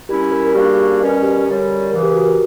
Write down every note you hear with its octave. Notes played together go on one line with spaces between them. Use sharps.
A#2 G3 C#4 E4 G4
A#4
A#4
C#3 G3 A#3 D4 F#4 G4
G4
B2 G3 C#4 A#4
G4
F#2 D3 G3 C#4
D2 C#3 E3 A#4
G4
F#4
A#4